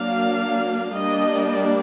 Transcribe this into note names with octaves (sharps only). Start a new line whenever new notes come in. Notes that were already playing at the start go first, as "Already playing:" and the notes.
Already playing: F#3 A#3 D4 F5
G3 A#3 D4 D#5